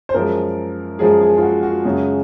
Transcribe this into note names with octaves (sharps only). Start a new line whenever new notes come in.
C5
F#2 F3 G#3 A#4
F#2 F3 G#3 G#4
G#4
F4
F#4
F#4
F#2 C#3 G#3